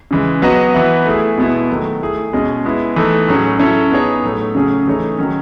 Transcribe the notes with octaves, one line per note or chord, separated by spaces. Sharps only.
C#3 E3 G#3
F#3 B3 F#4 B4 D#5
E3 B3 F#4 B4 E5
A3 E4 G#4
B2 G#3 B3 E4
D#3 F#3 A3
A3 E4 G#4
B2 G#3 C#4 G#4 D#5
G#3 B3 E4
E3 A3 D#4 A4
A2 F#3 C#4 G#4
F#3 C#4 E4 A4
B3 D#4 G#4 C#5
A2 F#3 A3
C#3 F#3 A3 C#4 G#4
E3 A3 D#4 G#4 C#5
D#3 F#3 C#4